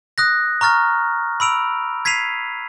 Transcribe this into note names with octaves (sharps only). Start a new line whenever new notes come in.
D#6 F#6 A#6
A#5 C#6 F6 A6
B5 E6 D7 F7
G#6 B6 C7 D#7 F7